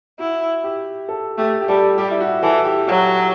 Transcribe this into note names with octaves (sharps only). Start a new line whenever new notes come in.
E4 F#4
G4
A4
A3 G4
G4
G3 A4
G3 G4
E4
F#4
E3 A4
G4
F#3 F#4